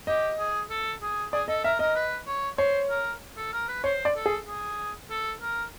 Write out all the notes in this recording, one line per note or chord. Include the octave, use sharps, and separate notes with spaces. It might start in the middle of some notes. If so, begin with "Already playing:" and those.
G4 D#5
G#4
A4
G#4
G#4 D5
A4 D#5
A#4 E5
A#4 D#5
B4
C#5
C5 C#5
A#4
A4
A#4
B4
C5 C#5
D5
A4
G#4
G#4
A4
A#4